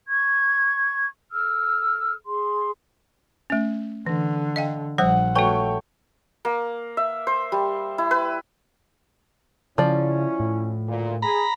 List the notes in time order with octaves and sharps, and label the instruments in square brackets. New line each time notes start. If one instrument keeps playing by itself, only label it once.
[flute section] C#6 G#6
A4 E6 F6
G#4 C6
[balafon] A3 C#4
[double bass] D3 [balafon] E3
[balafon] D#5 F5 G5
[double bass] A#1 [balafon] F3 G3 C5 [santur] F#5
[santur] A3 C#5 G5 [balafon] F#4 B4
[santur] A#3
E5
C5
G3
E4
B4
[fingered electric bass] C#3 [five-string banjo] F3 D5 [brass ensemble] C#4 E4
[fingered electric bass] A2
[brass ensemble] D2 A#2
[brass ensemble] G#4 [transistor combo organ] A#5 B5